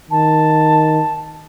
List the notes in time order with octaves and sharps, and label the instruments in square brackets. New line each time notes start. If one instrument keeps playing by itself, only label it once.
[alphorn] D#3 [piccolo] A5